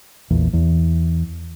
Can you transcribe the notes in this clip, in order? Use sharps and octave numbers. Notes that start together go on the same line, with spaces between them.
A#1 E2
E2